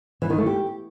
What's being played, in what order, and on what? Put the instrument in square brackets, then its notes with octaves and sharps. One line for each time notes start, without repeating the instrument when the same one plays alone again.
[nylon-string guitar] E3
D#3
A3
G4